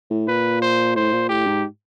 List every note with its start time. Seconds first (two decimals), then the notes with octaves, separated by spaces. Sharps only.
0.10 A2
0.28 A#2 B4
0.62 C5
0.96 A2 C5
1.13 A#2
1.29 A2 G4
1.47 G#2